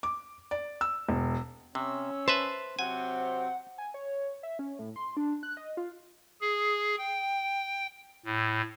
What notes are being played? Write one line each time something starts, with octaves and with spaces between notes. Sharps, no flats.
D6
D5
E6
E1
C3 C#4 E6
B4 C5 E5 A5
C3 F#3 C4 F#5 G#5
G#5
C#5
E5
C#4
A2
C6
D4
F#6
D#5
F4
G#4
G5
A2